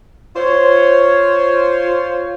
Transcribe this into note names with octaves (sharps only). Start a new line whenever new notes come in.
F4 C5 C#5